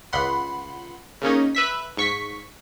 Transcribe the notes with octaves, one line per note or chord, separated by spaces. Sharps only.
C#2 F#5 B5 C6
C#3 A#3 C#4 D#4
B4 E5 B6
G#2 C#6 B6